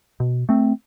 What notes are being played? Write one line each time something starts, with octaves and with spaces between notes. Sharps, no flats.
B2
A3 C4